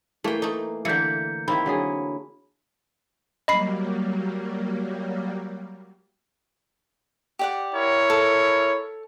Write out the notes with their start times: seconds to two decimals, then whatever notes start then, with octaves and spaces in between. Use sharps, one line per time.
0.24 E3 A3 A#3 G5
0.42 A3 D#4
0.85 D3 E3 A#3 E4 G6 C#7
1.48 D#3 A#3 C4 E4 B5
1.66 D3 F#3 G#4
3.48 F#3 G3 A#3 D#5 B5 C7
7.39 G4 D5 F#5
7.73 E4 A#4 C#5
8.10 A4